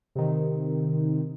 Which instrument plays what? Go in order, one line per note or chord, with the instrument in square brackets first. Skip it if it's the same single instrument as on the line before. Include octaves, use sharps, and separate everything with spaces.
[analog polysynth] C3 D#3